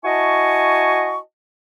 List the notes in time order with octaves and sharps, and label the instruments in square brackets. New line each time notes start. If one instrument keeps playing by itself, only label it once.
[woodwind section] E4 F#4 D#5 G#5 A5 C#6